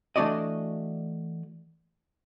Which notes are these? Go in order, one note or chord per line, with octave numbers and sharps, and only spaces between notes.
E3 A3 D4 F#4 D5 D#5